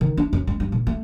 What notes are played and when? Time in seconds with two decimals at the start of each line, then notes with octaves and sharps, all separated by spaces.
0.01 D#3
0.17 D4
0.33 F#2
0.47 G#3
0.60 G2
0.72 A#2
0.87 A3